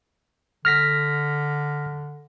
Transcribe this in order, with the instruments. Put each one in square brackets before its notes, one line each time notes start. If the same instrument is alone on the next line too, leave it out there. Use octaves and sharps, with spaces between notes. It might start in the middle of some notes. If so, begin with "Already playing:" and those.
[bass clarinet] D3 [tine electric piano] F6 A#6 B6